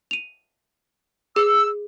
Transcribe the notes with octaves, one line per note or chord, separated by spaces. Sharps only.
D#7 F7
G#4 E6